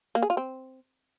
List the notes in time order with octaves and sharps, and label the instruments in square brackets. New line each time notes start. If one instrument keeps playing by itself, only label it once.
[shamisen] A#3
G#4
F4
C4